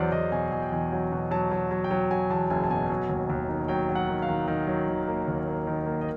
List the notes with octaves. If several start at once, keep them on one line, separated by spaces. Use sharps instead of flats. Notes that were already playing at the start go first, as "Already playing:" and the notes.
Already playing: E2 F#3 C5 D5
E2 D#5
B2 G#5
E2 G#5
G5
E2 G#5
F#3
B2
F#3 A5
F#3
F#3
G5
F#3
F#3 G#5
E2 A5
F#1 G#5
A5
B2 G#5
F#3 G#5
D#2
D#2
D#3
F#3 G5
F#3
F#5
D#3
F5
D#3
D#3
F#3
D#3
A#3
D#2
A#3
D#3
A#3
D#5